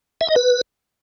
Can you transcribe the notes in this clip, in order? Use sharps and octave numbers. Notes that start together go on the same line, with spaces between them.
E5
D#5
B4